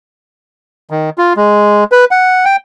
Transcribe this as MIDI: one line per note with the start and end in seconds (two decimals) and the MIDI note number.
0.90 1.10 51
1.18 1.33 65
1.36 1.84 56
1.92 2.05 71
2.11 2.45 78
2.45 2.56 79